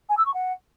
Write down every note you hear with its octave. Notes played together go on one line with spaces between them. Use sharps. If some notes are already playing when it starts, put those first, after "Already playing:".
G#5
E6
C#6
F#5